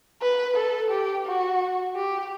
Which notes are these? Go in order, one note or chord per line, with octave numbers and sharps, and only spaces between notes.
B4
A4
G4
F#4
G4